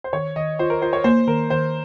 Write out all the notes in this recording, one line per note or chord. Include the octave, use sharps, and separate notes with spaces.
C5
D#3 C#5
D#3 D#5
F4 C5
A#4
F4 C5
C#5
A#3 C5
D#3 A#4
D#3 C5